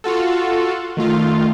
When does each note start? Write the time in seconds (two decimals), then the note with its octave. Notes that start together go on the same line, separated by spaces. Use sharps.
0.04 F4 F#4 A4
0.97 D#3 A3 F4